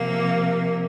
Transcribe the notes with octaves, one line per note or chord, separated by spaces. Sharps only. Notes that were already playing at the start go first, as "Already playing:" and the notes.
Already playing: C3 F3 A#3